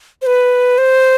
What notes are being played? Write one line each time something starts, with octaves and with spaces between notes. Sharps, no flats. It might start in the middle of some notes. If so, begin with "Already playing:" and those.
C5
B4
C5